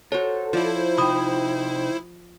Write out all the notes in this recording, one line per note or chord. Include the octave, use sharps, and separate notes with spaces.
F#4 A4 C5 C#5 A#5
F3 E4 C5 D5
C3 D#4 G5 B5 D#6